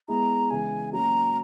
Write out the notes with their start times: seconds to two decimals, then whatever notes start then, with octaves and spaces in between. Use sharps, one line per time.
0.08 G#3 B3 E4 G#4 A#5
0.50 C#3 E3 G#3 G#5
0.93 F#3 A#3 C#4 F#4 A#5